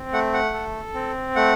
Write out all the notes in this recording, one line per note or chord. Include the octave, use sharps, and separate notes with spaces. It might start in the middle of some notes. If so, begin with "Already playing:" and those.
Already playing: C4
A3 F#5
F#5
A4
C4
A3 F#5